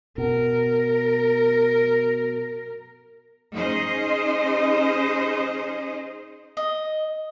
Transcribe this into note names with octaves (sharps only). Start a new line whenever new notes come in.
B2 A#4
C#4 D#4 G#4 C5 D#5
D#5